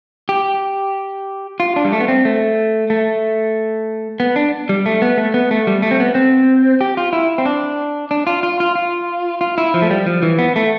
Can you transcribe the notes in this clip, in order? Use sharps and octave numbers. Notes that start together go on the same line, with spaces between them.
G4
F4
D4
G3
A3
B3
C4
A3
A3
B3
D4
G3
A3
B3
A3
B3
A3
G3
A3
C4
B3
C4
G4
F4
E4
C4
D4
D4
F4
F4
F4
F4
F4
E4
F3
A3
G3
F3
E3
B3
A3